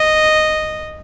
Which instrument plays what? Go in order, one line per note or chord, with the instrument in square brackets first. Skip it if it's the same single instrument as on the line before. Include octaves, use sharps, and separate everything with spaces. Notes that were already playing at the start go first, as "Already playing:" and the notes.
Already playing: [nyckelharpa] D#5